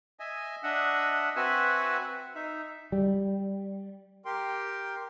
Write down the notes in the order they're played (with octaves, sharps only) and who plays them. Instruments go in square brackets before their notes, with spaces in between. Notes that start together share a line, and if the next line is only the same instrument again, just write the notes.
[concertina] D#5 E5 G#5
D4 D#5 E5 F#5
C4 F#4 B4 E5 F#5 G#5
D#4 E5
[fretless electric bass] G3
[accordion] G4 A#4 G5 C6